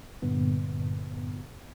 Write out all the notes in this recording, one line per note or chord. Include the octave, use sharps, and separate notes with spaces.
G2 A#2 D3 B3